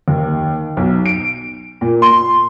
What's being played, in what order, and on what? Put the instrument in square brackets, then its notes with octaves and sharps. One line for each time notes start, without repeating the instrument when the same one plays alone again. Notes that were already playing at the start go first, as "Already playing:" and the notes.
[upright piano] D#2
B1
D7
A#2
C6